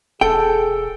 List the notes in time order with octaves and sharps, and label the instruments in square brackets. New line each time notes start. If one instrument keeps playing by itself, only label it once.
[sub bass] E1 [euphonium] G#4 [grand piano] A4 [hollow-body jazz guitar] G5